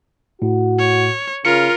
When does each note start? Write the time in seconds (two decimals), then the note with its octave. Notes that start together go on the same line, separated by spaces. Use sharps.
0.42 A2 F#4
0.79 C#5
1.45 C#3 F4 A#4 C#7